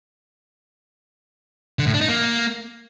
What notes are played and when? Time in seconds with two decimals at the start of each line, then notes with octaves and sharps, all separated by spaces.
1.79 D3
1.86 A2
1.94 D4
2.01 D#4
2.08 A#3